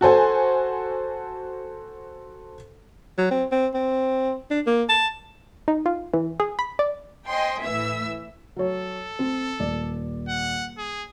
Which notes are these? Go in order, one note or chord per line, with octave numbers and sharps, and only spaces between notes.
F#4 A4 C5 G#5
F#3
C4
C4
C4
D4
A#3
A5
D#4
F4
E3
G#4
B5
D5
C5 D#5 G5 G#5 C6
A2 E3 E5 E6
F#3 A4 C#5
C4
D#1 D5
F#5
G#4